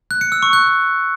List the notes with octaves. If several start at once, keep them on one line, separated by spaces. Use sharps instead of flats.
F#6
C#7
E6
C#6
F#6